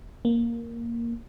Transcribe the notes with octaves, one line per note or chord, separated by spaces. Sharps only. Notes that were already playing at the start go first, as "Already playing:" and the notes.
A#3